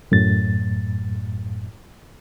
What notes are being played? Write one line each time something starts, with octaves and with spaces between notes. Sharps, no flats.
F#2 A2 A6